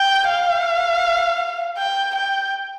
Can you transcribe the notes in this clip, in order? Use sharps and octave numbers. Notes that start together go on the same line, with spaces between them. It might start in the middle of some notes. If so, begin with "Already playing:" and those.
Already playing: G5
F5
G5
G5